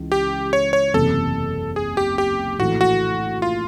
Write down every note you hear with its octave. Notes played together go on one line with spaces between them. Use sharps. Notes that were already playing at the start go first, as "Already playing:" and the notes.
Already playing: C#2 E3
G4
C#5
C#5
F#1 E2 C3 A4
G#4
G4
G4
A#1 A2 E3 A3 F#4
F#4
F4